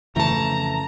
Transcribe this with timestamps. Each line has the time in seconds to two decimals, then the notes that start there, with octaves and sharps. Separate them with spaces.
0.16 F2 C#3 E3 A3 A5 A#5